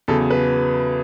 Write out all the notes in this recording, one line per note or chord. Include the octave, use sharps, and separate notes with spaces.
E2 C#3 F#3 A4
B4